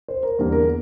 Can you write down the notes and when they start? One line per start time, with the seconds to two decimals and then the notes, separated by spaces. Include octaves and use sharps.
0.08 C5
0.23 A#4
0.39 E2 D3 G3 A#3 A#4
0.52 A#4